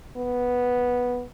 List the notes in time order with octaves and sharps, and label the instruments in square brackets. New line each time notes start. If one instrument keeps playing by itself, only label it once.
[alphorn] B3